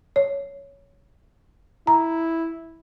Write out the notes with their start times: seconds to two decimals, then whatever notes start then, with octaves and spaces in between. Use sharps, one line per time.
0.16 C#5
1.87 E4 A#5